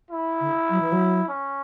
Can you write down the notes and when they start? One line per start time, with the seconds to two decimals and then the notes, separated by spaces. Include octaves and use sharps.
0.11 E4
0.41 D3
0.70 F#3
0.81 E3
0.92 F#3
1.29 C#4